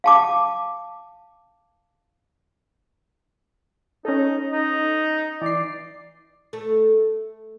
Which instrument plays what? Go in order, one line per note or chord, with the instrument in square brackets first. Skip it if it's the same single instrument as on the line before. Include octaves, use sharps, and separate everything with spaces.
[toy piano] F5 A5 D6
[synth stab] C#4 A4 [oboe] D#4
[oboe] D#4
[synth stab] E3 C7 [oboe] D5
[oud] A3